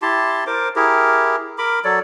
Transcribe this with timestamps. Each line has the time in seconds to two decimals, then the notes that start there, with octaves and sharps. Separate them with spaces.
0.02 E4 G4 A5 C6
0.47 A#4 C5 D6
0.76 E4 G4 G#4 A#4
1.58 A#4 B5 D6
1.85 F#3 A4 C#5 D5